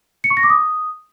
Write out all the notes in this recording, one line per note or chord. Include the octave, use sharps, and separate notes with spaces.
C#7
C#6
A#6
D6
D#6